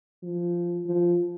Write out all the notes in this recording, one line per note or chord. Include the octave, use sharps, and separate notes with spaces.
F3
F3